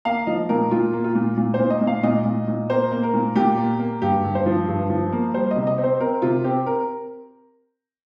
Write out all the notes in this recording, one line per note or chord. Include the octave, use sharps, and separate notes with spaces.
A#3 F5
F3 D#5
A#2 A#4
A#2 F4
A#3
F4
A#2
A#2
C5
A#2
D#5
A#2
F5
A#2 D#5
A#2
A#2
A#3 C5
A#3
A#4
A#2
A#2 G4
A#3
A#3
G2 G4
G2
C5
F3
G2
F3
A#3
G3 C5
D#5
C3
D#5
C4
C5
C4 A#4
C3 F4
C4 G4
A#4